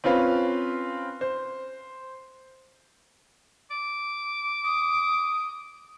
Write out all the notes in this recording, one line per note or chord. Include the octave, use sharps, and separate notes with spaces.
C4 C#4 F4 B4 F5
C5
D6
D#6